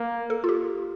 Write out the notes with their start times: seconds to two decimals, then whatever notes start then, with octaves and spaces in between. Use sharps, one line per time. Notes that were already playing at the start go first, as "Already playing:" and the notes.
Already playing: A#3
0.30 A4
0.44 F4
0.49 G4